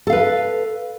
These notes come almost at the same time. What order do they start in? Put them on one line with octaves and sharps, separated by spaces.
A4 F5 B4